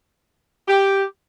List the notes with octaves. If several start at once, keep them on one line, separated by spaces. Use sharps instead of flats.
G4